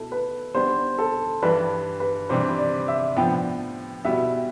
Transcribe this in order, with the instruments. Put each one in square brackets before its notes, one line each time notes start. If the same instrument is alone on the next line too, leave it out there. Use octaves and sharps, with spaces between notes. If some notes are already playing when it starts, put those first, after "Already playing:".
Already playing: [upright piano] B2 A3 E4 [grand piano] A4
[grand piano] B4
[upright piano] G3 B3 D4 [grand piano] C5
[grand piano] A4
[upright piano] G2 E3 G3 D4 [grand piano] B4
[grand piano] B4
[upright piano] C3 E3 G3 D4 [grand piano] C5
[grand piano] D5
E5
[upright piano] A2 F3 B3 D4 [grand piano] G5
[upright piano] B2 G3 B3 E4 [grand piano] E5